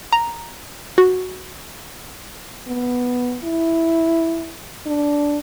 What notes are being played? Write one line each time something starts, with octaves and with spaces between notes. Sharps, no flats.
A#5
F#4
B3
E4
D4